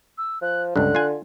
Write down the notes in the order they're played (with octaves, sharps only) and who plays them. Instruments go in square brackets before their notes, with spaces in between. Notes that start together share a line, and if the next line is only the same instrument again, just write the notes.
[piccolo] E6
[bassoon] F3 [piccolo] F#6
[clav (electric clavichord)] C#2 G2 [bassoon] D3 [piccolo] F#6
[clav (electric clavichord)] F4 G#5